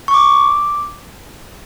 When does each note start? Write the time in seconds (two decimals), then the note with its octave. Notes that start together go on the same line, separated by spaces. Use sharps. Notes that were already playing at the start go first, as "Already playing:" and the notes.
0.08 C#6
0.14 D6